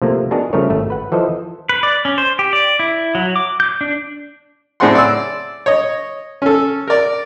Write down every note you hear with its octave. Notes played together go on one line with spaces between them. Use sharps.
C3 F3 A3 A#3
B3 D4 D#4 F#4 G#4 A#4
C#3 F3 G3 A3 A#4 C#5
G#1 A3 E5
B4 F#5
E3 F3 A4 C5 D#5
B4
D5
C#4
C5
G4
D5
E4
F#3
D6
G6
D4
A2 C4 G#4 D5 F#5 C6
D5 E6
C#5 D#5
C#4 A4
A#4 D5